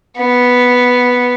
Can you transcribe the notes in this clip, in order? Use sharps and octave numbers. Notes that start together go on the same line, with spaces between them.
B3